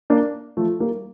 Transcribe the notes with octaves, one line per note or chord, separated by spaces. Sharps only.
A#3 D4
F3 A3
G3 A#3